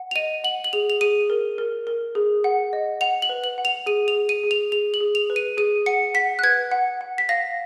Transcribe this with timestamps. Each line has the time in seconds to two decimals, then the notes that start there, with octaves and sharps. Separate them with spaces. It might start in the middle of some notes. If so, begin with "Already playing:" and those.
Already playing: F#5
0.11 F7
0.15 D#5 D#7
0.44 F#5 F#7
0.64 F#7
0.73 G#4 F7
0.90 F7
1.01 G#4 D#7
1.30 A#4
1.58 A#4
1.87 A#4
2.15 G#4
2.44 F#5
2.73 D#5
3.01 F#5 F7
3.22 F#7
3.29 B4
3.44 F#7
3.58 F#5
3.65 F7
3.86 G#4 D#7
4.08 F7
4.15 G#4
4.29 D#7
4.43 G#4
4.51 F7
4.72 G#4 F7
4.94 F#7
5.01 G#4
5.15 F7
5.30 B4
5.36 D#7
5.57 G#4 D#7
5.86 F#5 C#7
6.15 F#5 B6
6.39 F#6
6.43 B4 G#6
6.71 F#5
7.01 F#5
7.18 B6
7.29 F5 A#6